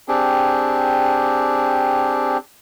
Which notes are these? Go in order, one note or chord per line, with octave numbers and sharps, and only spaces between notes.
C4 D4 G4 G#4